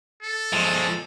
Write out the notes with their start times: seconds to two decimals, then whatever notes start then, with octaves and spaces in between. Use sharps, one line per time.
0.23 A4
0.53 F3 G#3